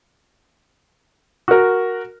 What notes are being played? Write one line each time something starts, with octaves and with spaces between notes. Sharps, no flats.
F#4 A#4